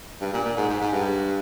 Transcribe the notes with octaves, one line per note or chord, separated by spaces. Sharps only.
G2
A#2
A#2
G#2
G#2
G#2
G2